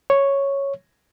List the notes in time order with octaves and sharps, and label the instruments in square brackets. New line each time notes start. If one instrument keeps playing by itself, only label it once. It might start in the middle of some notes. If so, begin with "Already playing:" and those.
[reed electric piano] C#5